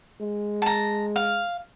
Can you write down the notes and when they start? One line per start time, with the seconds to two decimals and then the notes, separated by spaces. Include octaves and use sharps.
0.21 G#3
0.62 A5 A#5
1.16 F5